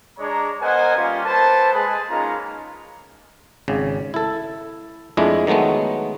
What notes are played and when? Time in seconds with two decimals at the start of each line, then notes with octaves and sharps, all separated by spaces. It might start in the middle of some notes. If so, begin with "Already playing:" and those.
0.19 G#3 D4 C#5 A#5
0.62 B3 A#4 C5 D#5 F#5 G#5
0.96 G3 A#3 C#4 F4
1.24 A#3 A4 B4 C5 A5
1.72 G#3 G#4 B4
2.09 G#3 A#3 C#4 D#4 F4 A#5
3.68 G#1 C#3
4.14 E4 A4
5.17 F2 G#3 A3 D4 E4
5.47 D#3 F#3 G#3 A3 B3